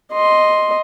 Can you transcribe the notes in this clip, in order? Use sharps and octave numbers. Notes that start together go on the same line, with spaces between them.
D#5 C6